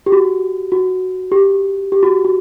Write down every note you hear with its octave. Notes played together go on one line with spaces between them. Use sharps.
G4
F#4
F#4
G4
G4
F#4
F#4